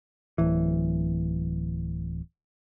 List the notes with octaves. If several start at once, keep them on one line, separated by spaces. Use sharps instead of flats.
D1 E3